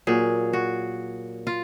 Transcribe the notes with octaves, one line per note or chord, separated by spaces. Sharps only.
A#2 F#3 G#4
F#4
F4